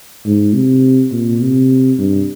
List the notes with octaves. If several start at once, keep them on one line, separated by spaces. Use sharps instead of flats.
G#2
C3
A#2
C3
G2